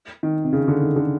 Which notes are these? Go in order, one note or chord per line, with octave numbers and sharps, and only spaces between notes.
D#3
C3
C#3
D3
D#3
D3